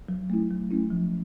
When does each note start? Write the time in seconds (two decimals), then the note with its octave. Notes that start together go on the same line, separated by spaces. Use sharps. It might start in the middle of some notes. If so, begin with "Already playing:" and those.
0.09 F#3
0.30 A3 C#4 E4
0.51 F#3
0.71 A3 C#4 E4
0.90 F3